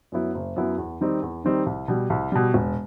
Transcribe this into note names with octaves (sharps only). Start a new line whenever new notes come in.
F#2 F#3 B3 E4
F#1
F#2 F#3 B3 E4
E2
D#3 G3 C4 D#4
E2
D#3 G3 C4 D#4
C2
B2 G3
C2
B2 G3
E1